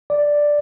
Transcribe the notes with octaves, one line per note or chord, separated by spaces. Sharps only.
D5